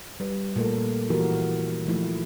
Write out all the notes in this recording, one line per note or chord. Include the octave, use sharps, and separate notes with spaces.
G3 B4
A#2 A3 A4 A#4
E3 F3 E4 F#4 G4 A#4
A#2
D#3 F3 A3 E4